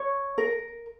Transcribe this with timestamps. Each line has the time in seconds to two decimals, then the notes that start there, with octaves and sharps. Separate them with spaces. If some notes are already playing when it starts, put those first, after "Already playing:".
Already playing: C#5
0.38 A#4